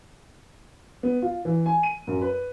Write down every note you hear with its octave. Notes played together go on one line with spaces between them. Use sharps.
B3
F4
E3
G#5
D#7
F#2
B4